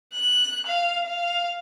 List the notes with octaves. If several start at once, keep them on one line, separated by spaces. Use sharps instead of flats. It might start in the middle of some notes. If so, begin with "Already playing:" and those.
F#6
F5
F5